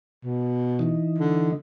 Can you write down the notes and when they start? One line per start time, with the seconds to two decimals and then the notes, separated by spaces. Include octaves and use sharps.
0.25 B2
0.79 E3 D#4
1.18 D3